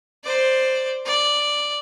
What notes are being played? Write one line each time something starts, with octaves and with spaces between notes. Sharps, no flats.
C5 D5
D5